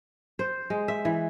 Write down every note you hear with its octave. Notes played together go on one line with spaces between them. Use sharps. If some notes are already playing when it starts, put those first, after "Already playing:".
C5
G#3
E5
E3